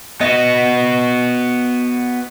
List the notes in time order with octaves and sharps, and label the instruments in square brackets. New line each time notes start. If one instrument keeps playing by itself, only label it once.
[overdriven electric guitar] B3 F#4 [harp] D#5